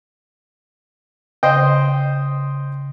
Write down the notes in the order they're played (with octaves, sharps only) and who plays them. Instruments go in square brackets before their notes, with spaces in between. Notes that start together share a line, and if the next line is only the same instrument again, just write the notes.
[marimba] C#3 [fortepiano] C5 D#5 G5